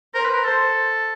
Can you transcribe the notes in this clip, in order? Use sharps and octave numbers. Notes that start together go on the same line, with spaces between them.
A#4 C5
B4
A#4
A4 C5